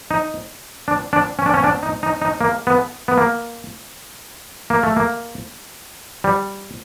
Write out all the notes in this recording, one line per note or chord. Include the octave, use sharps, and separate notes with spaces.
D#4
D4
D4
C#4
D4
C#4
D4
D#4
D#4
D#4
A#3
B3
B3
A#3
A#3
A3
A#3
G3